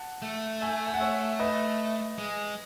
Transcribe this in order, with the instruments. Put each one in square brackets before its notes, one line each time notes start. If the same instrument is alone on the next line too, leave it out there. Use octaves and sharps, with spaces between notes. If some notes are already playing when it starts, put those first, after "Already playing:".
Already playing: [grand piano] F#5 A5
[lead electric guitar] A3
[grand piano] E5 G#5
G#5
F#5
C#5 E5
B4 D#5
[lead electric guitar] G#3